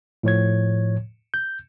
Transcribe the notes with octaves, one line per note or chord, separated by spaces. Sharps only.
A2 F3 C#5 G#6
G6